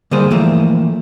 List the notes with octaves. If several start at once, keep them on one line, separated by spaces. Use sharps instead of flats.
D3 G3 A#3 G#4 C5
E3 F3 A3 A#3